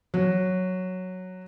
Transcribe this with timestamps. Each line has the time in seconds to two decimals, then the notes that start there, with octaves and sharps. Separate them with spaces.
0.14 F#3